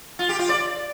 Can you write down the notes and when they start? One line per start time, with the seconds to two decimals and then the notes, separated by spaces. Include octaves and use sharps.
0.19 F4
0.29 G4
0.39 F4
0.49 D5